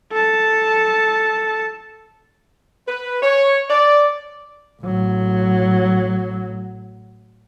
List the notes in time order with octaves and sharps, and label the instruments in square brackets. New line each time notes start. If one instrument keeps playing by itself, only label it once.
[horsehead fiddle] A4 A5
[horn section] B4
C#5
D5
[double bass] A1 F#3